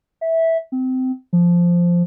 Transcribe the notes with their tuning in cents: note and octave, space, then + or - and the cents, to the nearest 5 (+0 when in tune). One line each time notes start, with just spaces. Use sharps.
E5 -10
C4 -25
F3 -5